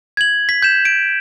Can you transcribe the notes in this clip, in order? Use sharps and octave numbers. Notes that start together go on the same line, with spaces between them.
G#6 F#7
B6
G6 E7
D7